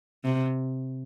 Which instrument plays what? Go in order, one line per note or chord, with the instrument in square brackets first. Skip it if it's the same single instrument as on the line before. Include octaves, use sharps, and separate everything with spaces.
[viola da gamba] C3